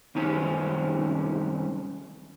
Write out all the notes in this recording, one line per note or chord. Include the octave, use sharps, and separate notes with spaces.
C2 F#2 D#3 C#4